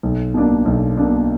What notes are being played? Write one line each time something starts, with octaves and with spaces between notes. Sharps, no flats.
B1
B2 A#3 D4
B1
B2 A#3 D4